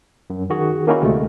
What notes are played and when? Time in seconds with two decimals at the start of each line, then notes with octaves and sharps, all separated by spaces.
0.30 F#2
0.50 D#3 F#4 G#4
0.87 D#3 A#3 C#4 D#4 E4 F#4
1.02 D2 C3 G#3 A3